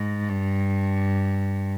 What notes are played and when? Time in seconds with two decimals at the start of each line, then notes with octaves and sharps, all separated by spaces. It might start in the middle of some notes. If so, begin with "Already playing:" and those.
Already playing: G#2
0.29 G2